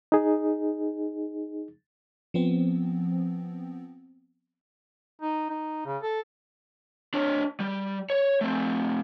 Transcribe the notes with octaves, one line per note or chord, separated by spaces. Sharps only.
D#4 G#4
F3 B3 C4
D#4
D#4
C#3
A4
D4 C#5
G3
C#5
A3 C4